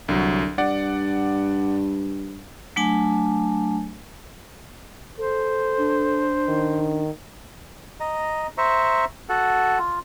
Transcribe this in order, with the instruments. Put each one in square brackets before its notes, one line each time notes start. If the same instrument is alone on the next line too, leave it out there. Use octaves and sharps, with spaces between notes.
[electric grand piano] C2 F#3 [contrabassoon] D3
[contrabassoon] G2 [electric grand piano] D5 F#5
[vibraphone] F#3 A3 D4 G#5 A5
[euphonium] A4 [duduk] C5
[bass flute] D4
[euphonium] D#3
[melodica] D#5 A#5
C5 E5 A#5 C#6
F#4 A4 F#5
F4